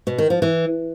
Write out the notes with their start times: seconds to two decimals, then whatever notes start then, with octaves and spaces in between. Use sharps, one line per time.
0.07 B2
0.18 D#3
0.30 F3
0.42 E3